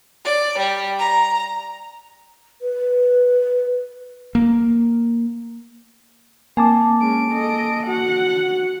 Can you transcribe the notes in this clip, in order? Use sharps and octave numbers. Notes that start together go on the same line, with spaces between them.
D5
G3
A#5
B4
A#3
A#3 C4 G#5 A5 D6
G#3 C#4 D7
A4 D#5
F#4 F#5